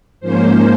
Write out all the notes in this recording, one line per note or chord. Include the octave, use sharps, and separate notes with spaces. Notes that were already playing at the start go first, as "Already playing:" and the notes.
G#2 F3 A#3 C#4 C5